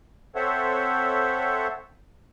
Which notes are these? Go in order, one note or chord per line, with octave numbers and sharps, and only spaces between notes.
C4 A4 C5 C#5 E5 F#5